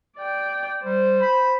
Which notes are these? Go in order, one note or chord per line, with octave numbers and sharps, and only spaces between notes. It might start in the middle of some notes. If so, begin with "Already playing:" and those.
D5 G5
G3 C5
B5